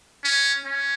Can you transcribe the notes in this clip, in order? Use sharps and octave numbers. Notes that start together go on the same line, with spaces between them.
C#4
C#4